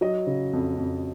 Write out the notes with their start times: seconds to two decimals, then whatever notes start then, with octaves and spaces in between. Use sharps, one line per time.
0.01 F#3 D#5
0.27 C#3
0.53 F2
0.78 F2